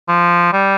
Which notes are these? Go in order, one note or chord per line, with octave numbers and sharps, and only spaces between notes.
F3
G3